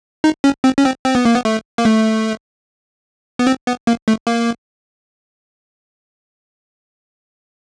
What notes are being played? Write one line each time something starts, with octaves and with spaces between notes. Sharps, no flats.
D#4
C#4
C4
C#4
C4
C4
B3
A#3
B3
A3
A#3
A3
B3
C4
B3
A#3
A3
A#3